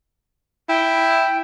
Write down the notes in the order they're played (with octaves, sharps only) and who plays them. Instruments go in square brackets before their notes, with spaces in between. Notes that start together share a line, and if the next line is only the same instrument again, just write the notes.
[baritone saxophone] E4 [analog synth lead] G5